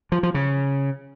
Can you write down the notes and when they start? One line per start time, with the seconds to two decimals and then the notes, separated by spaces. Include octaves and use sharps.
0.12 F3
0.23 F3
0.34 C#3